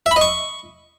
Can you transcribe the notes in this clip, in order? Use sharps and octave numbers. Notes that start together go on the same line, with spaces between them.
E5
B5
D#5
C#6